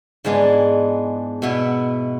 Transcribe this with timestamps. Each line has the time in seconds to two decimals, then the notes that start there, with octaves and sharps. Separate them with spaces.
0.25 G#2 E3 G#3 B3 D4
1.42 B2 B3 E4